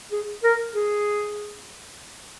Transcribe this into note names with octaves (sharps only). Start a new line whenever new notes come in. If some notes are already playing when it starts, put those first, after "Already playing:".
G#4
A#4
G#4